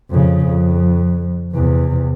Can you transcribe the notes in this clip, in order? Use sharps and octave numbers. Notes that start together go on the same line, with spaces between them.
F2 C#3
F2
E2 C3